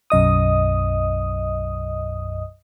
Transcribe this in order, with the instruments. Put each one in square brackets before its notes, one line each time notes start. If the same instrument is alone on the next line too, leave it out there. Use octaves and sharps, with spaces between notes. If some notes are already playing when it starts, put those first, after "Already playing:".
[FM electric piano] B1 F#2 D#5 D#6